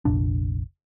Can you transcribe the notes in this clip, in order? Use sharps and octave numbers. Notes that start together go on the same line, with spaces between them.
F1 A#1 D4